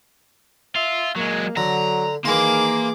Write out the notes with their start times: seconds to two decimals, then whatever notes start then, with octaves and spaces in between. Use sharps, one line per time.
0.76 F4 E5
1.16 F#3 G#3 A#3
1.57 D3 F#3 A#5
2.25 D#3 E3 A#3 F4 G#4 D6